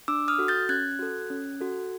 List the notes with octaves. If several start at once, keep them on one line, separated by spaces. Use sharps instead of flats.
D4 D6 E6
D#6 F6
F#4 A4
G6 A6
C#4 F#6 G#6
F#4 A4
C#4
F#4 A4